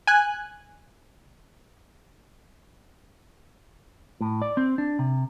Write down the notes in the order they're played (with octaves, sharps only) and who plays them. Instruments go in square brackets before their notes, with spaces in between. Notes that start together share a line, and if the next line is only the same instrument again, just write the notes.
[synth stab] G#5 F#6
[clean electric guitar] A2
D5
C4
D4
C3